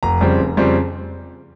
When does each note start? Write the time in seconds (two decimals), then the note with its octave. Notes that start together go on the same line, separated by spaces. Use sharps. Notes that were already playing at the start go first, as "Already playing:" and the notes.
0.03 F1 A#5
0.21 F2 C#3 G3 C4
0.39 F1
0.57 F2 C#3 G3 C4